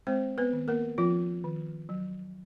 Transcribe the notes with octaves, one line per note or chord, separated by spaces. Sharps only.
G#3 C4 C5
B3 B4
D#3
A#3 A#4
F3 C4 F4
D#3
F#3